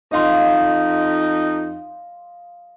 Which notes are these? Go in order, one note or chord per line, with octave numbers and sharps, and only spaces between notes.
F2 D#4 D#5 F5 C6